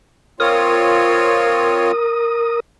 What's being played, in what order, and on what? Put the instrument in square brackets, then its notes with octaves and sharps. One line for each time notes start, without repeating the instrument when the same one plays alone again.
[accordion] C4 F4 C#5 [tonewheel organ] A#4 D#6